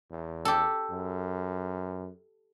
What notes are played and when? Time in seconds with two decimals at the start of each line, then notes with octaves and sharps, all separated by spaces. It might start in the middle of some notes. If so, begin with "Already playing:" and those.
0.11 E2
0.45 G4 A4
0.90 F#2